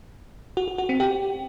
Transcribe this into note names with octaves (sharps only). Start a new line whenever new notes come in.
F#4
F#4
F#4
C4
G4